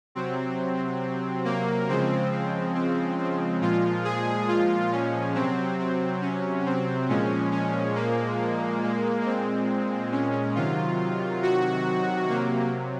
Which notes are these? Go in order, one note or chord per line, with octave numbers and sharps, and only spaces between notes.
C3 F#3 C4
A#3
C#3 F3 G#3 C4
C4
C4
C4
A#2 F3 G#3 F4
G#4
F4
C#4
C3 F#3 C4
C4
C#4
C4
A#2 F3 G#3 C#4
C#4
A#3
A#2 G#3
C4
C#4
C3 D#3 F#3 F4
F#4
C3 F#3 A#3